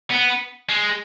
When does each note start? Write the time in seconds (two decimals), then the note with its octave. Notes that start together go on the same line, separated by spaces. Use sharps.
0.11 B3
0.69 G#3